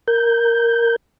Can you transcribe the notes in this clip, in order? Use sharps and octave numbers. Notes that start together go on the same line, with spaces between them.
A#4 G6